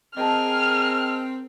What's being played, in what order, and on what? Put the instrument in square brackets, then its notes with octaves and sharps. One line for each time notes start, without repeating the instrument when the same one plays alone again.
[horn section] C4 [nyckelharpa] G#4 A#4 [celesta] D#5 A5 [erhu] F6